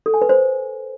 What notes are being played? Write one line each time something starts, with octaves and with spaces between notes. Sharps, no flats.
A4
G#5
B4
C5